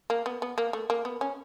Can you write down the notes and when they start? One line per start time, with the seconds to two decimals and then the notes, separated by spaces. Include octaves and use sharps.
0.10 A#3
0.26 B3
0.42 B3
0.58 A#3
0.73 A3
0.90 A#3
1.05 B3
1.21 C#4